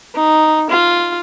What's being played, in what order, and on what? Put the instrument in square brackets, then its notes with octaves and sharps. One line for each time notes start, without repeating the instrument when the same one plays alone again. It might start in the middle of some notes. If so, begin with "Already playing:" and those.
[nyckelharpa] D#4
F4